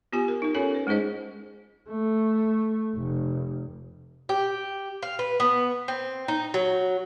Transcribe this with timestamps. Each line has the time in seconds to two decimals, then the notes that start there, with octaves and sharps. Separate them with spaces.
0.13 B3 F4 G4 G#5
0.28 A#4
0.42 D#4 A#4
0.54 C#4 F4 A4 C#5 G#5
0.74 B4
0.87 G#3 D#4 G#4 C5 D#5
1.89 A3
2.95 F1
4.29 G4
5.03 F5
5.19 B4
5.40 B3
5.88 C4
6.28 D#4
6.54 F#3